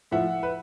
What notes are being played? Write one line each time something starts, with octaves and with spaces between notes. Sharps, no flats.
A2 F3 E5 F#5
B4